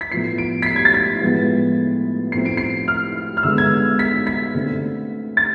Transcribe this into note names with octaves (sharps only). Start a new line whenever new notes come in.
B6
A2 F3 B3 C7
D7
B6
C7
G#6
A6
B6
A2 F3 G#3 B3
A2 F3 A3 C4 C7
D7
C7
F6
F6
D3 G#3 B3 E6
G#6
B6
B6
D3 A3 C4
A6